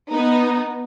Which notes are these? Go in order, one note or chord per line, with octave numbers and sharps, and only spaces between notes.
B3 D#4